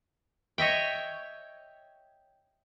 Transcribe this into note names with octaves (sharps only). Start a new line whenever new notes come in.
C#5 D#5 E5 G5